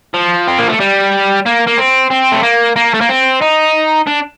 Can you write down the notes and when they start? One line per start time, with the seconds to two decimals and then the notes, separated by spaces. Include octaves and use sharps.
0.14 F3
0.47 C4
0.58 A#3
0.69 A3
0.80 G3
1.46 A#3
1.67 A#3
1.78 C4
2.10 C4
2.32 A3
2.43 A#3
2.76 A#3
2.94 A3
3.01 A#3
3.09 C4
3.41 D#4
4.07 D4